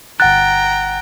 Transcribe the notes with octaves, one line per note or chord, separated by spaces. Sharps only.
G1 F#5 G5 A#5 F#6 A6